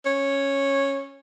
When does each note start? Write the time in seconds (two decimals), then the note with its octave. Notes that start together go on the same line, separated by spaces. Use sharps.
0.06 C#4